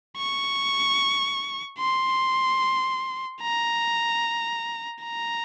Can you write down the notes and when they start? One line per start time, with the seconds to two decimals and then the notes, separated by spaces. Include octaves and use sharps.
0.18 C#6
1.79 C6
3.42 A#5
5.04 A#5